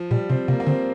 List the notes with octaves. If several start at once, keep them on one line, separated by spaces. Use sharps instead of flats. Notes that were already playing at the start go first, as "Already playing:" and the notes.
Already playing: F3
A#2 G3
C3 C4
C3 A#3
A#3
D3 C4